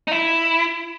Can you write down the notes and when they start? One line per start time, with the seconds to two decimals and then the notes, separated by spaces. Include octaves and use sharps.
0.08 D#4
0.12 E4